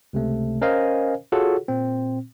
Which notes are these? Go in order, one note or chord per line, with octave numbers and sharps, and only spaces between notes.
C#2 C3 A3
C#4 A#4 C5 D#5 F5 G#5
F4 F#4 G#4 A4 C#5 F#5
A#2 C4